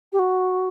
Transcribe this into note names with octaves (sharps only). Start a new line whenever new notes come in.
G4
F#4